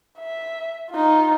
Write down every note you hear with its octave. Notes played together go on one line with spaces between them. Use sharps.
E5
D#4 F4